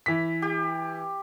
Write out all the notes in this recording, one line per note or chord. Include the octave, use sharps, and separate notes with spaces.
E3 B6
G4